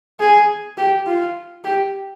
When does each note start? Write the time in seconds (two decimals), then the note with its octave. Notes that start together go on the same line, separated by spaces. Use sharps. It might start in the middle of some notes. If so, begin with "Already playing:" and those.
0.20 G#4
0.77 G4
1.06 F4
1.64 G4